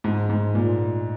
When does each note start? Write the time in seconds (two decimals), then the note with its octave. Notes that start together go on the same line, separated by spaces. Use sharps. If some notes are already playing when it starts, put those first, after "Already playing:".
0.04 G#2
0.30 G#2
0.55 A#2